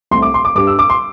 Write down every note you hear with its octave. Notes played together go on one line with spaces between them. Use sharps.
C2 C3 A3 C6
D6
C6
D6
G2 G3 D4 D6
E6
D6
C6